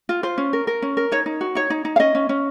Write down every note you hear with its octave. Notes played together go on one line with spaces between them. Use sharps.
F4
F4 C5
C#4
A#4
A#4
C#4
A#4
D#4 C#5
D#4
F#4
D#4 C#5
D#4
D#4
F5
C#4 D#5
C#4
C#4